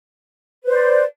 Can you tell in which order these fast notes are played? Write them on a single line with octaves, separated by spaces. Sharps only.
B4 C5 D5